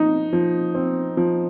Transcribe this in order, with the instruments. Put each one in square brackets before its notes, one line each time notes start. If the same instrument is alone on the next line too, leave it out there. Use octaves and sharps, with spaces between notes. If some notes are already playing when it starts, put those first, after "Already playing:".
Already playing: [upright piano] F3 D#4
F3
C4
F3